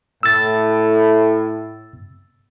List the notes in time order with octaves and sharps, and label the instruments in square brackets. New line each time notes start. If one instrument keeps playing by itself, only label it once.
[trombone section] A2 [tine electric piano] E6 A6